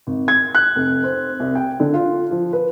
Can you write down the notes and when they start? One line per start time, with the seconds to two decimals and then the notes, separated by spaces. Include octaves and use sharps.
0.07 G#1
0.28 G#6
0.55 F#6
0.76 F1
1.04 C4
1.40 C2
1.55 G5
1.80 D3
1.94 F4
2.31 F3
2.53 B4